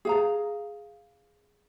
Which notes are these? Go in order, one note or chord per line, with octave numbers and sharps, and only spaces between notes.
G#4 F5 A#5